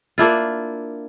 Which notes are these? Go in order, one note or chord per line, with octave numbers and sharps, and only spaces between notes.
A#3 D4 E4 F4